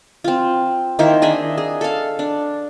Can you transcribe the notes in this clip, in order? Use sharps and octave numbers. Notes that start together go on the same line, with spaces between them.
C4 F4
D#3 A#3 E4 C5
D4 G#4 D#5 E5
G#4
A4 F5
D4